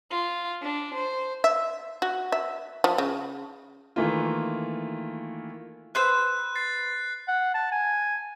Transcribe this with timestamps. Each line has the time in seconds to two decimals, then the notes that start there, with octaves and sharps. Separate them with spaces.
0.11 F4
0.63 D4
0.95 C5
1.44 E5
2.02 F#4
2.32 E5
2.84 F3
2.98 C#3
3.96 D#3 E3 A3 A#3 F4
5.95 B4 C5 E6 F#6
6.55 A6 C7
7.28 F#5
7.54 A5
7.72 G#5